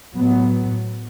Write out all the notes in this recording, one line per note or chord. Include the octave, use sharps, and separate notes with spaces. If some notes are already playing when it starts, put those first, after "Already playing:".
A2 F#3 B3